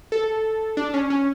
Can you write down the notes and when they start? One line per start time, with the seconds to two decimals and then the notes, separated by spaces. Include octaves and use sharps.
0.12 A4
0.77 D4
0.94 C#4
1.10 C#4